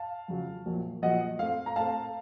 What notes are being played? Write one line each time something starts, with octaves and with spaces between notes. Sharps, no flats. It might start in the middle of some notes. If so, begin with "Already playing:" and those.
Already playing: F5 A5
F2 C#3 F#3
A#1 A#2 F#3
A#1 A#2 F#3 D#5 F#5
A2 A3 C4 F5
A#5
A2 A3 C4 F5 A5